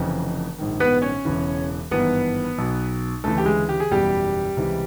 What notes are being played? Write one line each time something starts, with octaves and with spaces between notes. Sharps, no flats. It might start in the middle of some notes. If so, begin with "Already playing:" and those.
Already playing: F1 F2 C#3 E3
A#1 G#2 D#3
B3 B4
C#4 C#5
E1 E2 C#3 E3
G#1 G2 E3 B3 B4
B1 B2
D2 C#3 E3 A3 A4
G4
G#3 G#4
G4
G#4
F#1 E2 B2 G3 G4
C#2 C3 E3